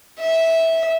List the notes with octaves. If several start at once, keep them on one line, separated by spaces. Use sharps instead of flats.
E5